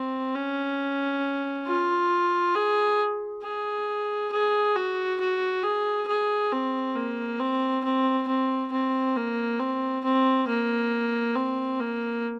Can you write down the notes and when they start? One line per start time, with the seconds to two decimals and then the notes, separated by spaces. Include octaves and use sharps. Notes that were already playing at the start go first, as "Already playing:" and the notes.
Already playing: C4
0.35 C#4
1.67 F4
2.55 G#4
3.43 G#4
4.32 G#4
4.76 F#4
5.20 F#4
5.63 G#4
6.08 G#4
6.52 C4
6.96 A#3
7.39 C4
7.84 C4
8.28 C4
8.72 C4
9.17 A#3
9.60 C4
10.04 C4
10.48 A#3
11.36 C4
11.80 A#3